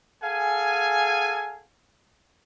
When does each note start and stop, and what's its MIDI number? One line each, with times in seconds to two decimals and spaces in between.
0.22 1.64 68
0.22 1.64 69
0.22 1.64 77
0.22 1.64 78
0.22 1.64 80